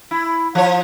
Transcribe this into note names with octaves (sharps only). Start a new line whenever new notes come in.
E4
F3 C#5